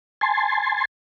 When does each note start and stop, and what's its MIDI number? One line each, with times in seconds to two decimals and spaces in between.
0.21 0.85 80
0.21 0.85 81
0.21 0.85 84